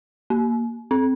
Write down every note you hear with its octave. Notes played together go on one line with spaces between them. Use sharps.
A#3
C4